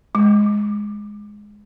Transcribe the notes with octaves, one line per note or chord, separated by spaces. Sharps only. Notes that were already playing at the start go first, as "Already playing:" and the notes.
G#3